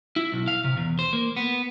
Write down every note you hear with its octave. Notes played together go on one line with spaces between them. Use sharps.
E4
B1
F5
C3
E2
C5
A#3
B3